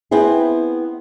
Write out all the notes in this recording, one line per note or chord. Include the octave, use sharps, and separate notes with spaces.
B3 C4 E4 G#4